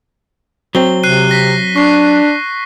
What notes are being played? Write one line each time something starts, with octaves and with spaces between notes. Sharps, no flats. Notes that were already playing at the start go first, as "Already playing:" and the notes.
F#3 C4 G7
C3 F#6 C7 D#7
A#6 B6
D4 C#6 C7